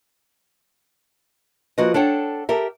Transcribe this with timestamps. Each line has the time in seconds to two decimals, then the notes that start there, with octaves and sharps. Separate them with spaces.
1.78 F3 A#3 F#4 B4 D#5
1.94 D4 A4 C#5 F#5 G5
2.49 G4 A4 A#4 E5